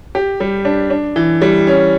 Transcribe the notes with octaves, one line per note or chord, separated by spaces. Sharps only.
G4
G3
D4
D4
E3
G3
C#4